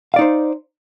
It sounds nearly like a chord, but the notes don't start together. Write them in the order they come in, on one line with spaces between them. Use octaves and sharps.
F5 D5 D#4 C5